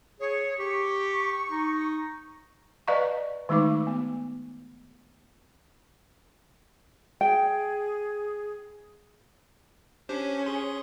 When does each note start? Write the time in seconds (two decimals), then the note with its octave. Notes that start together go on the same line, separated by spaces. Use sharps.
0.20 G#4 C#5
0.58 G4 C#6
1.51 D#4
2.88 B4 D5 D#5 F5 A#5 C#6
3.49 D#3 G#3 A3 D#4 D6
3.87 B3
7.21 G#4 G5
10.09 C#4 D4 G4 C5
10.46 G#4 C6